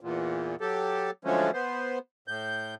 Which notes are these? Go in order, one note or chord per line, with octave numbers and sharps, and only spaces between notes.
E2 A#2
F#3 G4 A4
D3 F3 F#3 G#3 A3 C#4
B3 C5
A2 G6